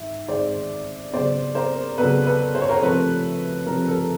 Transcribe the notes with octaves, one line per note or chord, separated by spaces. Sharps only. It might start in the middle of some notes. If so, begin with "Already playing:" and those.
Already playing: G#2 D#3 E5
G#2 D#3 G#3 C5 D5
C#3 F#3 B3 C5 D5
A#4 C5
C#3 F#3 B3 A4 B4
A4 B4
C5
C#5
A#4 C5
C3 F3 A3 A4 B4
C3 F3 A3 A#4
A4 B4